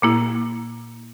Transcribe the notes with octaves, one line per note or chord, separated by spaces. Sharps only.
A#2 A#3 E4